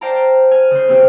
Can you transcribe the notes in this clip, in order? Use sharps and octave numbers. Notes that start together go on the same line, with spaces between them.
C5 D5 F5 G5 A5 A#5
G#5 F6
C#3 C5
E2 C3 C4 F6